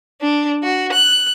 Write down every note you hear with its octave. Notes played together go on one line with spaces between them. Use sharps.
D4
F#4
F#6